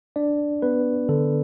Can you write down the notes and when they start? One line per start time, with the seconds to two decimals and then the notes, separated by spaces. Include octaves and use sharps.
0.16 D4 D5
0.62 B3 B4
1.09 D3 A4